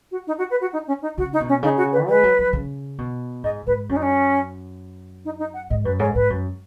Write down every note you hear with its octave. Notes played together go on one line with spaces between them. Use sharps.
F#4
D#4
F#4
B4
F#4
D#4
C#4
D#4
C#3 F#4
D#4
B2
C#4
C#3 D#4
F#4
B4
G#3 B4
F#3
F#3
C#3
B2
G#2 D#5
G#2 B4
F#2 C#4
D#4
C#4
D#4
D#4
F#5
G#2 D#5
F#2 B4
G#2 C#5
G#2 B4
F#2